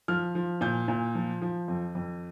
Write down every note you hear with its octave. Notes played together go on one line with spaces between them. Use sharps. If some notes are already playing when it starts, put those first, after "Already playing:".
F3 F6
F3
A#2 G6
A#2
F3
F3
F2
F2